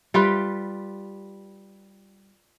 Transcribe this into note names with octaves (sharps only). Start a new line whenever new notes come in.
G3 F4 G4 B4